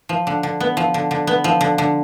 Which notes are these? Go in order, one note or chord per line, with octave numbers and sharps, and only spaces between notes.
F3
D3
D3
B3
F3
D3
D3
B3
F3
D3
D3